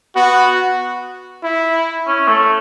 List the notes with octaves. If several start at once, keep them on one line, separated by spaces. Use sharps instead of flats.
B3 F#4
E4
C#4
A3